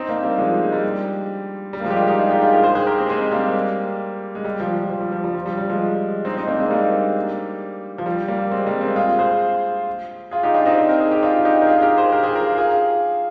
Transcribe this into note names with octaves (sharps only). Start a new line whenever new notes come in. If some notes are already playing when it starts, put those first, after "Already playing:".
Already playing: C4 D#4
A#3 D4
G3 A#3
F3 G#3
G#3
G3
G3
A#3
F3 G#3
G4
D4 F4
D#4 G4
F4 G#4
D#4 G4
F4 G#4
G4 A#4
G#4 C5
G#4 C5
G4 A#4
G#3 C4
G#3 C4
G3 A#3
G#3
G3
F3
F3
F3
G3
F3
G3
F3
G3
G3
F3 G#3
C4 D#4
C4 D#4
A#3 D4
G#3 C4
G3 A#3
F3
G3
G3 A#3
G#3 C4
G3 A#3
G#3 C4
F4 G#4
G#4 C5
F4 G#4
D#4 G4
D4 F4
C4 D#4
A#4
G#4
G4
D4 F4
D#4 G4
A#4
F4 G#4
G#4
G4 A#4
G#4 C5
G4 A#4
F4 G#4
G4 A#4
F4 G#4
F4 G#4